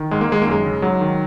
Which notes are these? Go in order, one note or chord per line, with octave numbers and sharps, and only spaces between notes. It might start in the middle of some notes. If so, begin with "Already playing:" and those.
Already playing: D#3
G#2 G#3
A#3
D#3 G#3
A#3
F#2 G#3
C#3
G#2 F#3
D#3